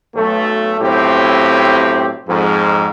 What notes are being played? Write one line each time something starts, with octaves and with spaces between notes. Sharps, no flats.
B1 A3
B1 A2 C4 G4
F2 G#2